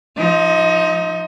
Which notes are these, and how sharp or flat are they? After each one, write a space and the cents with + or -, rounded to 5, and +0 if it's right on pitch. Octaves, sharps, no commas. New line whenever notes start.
F3 +0 D#4 +0 D#5 +35